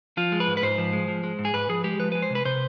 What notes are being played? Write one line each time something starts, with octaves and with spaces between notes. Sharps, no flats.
F3 F4
G#3
B4
G#2
B4
G#2 C5
F3
G#3
F3
G#3
G#2
G#4
G#2 B4
F3 G#4
G#3 G4
F3 B4
G#3 B4
C5
C3
B4
C3 C5